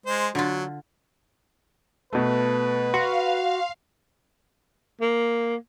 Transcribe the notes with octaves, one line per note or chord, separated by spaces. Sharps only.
G#3 C5
D3 F#3 F4
B2 A3 B4
F#4 F5 C6
A#3